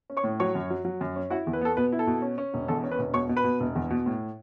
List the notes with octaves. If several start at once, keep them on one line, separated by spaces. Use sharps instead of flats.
C#4
C#5 C#6
A2
F#3 C#5 C#6
F#2
F#3
F#3
F#2
C#4
E4 F#4 F#5
E2
B4
B3 A4
B2 B4
E4
A4
B2
C#4
C#4
E1
E2 A4
C#4
B4
E1
B2 C#5 C#6
B2
B4 B5
B2
E1
E2
B2
A2